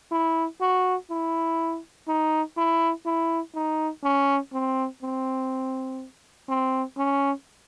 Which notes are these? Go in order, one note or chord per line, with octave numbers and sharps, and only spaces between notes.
E4
F#4
E4
D#4
E4
E4
D#4
C#4
C4
C4
C4
C#4